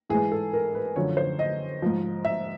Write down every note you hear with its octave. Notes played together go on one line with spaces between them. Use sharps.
G#2 E3 G#4
A4
A#4
B4
F#2 D3 F3 C#5
C5
D#5
G#2 F3
E5